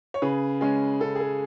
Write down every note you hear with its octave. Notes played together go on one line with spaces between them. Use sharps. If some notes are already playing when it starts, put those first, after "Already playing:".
C#5
C#3 G#4 B4
G#3 C#4
C#3 A4
G#4
A4